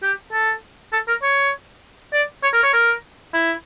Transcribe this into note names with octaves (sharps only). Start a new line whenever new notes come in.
G4
A4
A4
A#4
C#5
D5
C#5
A#4
C#5
A#4
E4